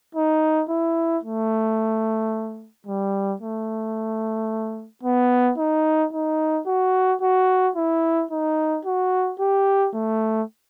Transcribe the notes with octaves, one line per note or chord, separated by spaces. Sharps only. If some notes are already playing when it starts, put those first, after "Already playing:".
D#4
E4
A3
G3
A3
B3
D#4
D#4
F#4
F#4
E4
D#4
F#4
G4
A3